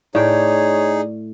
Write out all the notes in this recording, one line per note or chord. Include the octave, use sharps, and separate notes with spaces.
A2 D#4 G#4 C#5 D5 G5